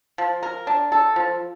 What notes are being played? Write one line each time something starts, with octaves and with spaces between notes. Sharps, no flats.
F3
A#4
D4
A4
F3